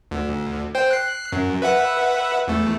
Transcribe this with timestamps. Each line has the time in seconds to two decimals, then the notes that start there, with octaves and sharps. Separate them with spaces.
0.11 D2
0.75 C5 G5
0.90 F#6 C7
1.32 F#2
1.62 B4 E5 F#5
2.48 E2 A3